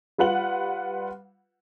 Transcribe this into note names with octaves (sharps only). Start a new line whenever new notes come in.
G3 F4 B4 F#5 F#7